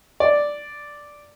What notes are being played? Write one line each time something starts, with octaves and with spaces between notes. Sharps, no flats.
D5